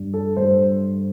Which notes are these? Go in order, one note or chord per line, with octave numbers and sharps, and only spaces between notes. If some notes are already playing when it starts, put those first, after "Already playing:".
Already playing: G2
A4
G2 C5